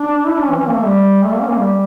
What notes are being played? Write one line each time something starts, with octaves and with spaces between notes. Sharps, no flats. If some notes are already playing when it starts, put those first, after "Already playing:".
Already playing: D4
E4
D4
C#4
E3
C#4
A#3
A3
G3
A3
A#3
C#4
A#3
G3